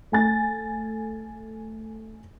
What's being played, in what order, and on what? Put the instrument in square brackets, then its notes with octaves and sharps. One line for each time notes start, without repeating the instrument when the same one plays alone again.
[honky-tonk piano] A3 G#5 A6